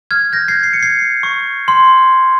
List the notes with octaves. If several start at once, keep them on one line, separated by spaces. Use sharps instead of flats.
F6 G#6
G6 A#6
G#6 C7
C7
C#7
G#6 C7
C#6
C6